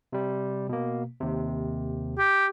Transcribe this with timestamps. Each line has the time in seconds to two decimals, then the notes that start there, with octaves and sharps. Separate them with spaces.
0.13 C3 G3
0.69 B2 A#3
1.20 D#2 C3
2.18 G4